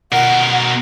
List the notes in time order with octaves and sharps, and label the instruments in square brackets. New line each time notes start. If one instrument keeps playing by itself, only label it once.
[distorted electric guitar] B2 A#4 [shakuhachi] F#5